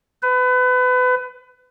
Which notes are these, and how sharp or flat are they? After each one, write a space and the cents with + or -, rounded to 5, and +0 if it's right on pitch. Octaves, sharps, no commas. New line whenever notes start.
B4 +30